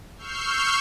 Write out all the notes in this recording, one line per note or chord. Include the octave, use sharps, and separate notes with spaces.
C#6 E6 F6 G6 C7